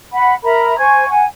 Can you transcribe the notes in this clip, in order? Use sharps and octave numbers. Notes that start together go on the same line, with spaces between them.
F#5 B5
A#4 E5 A#5 B5
C5 G#5 C#6 G#6
F#5 G#5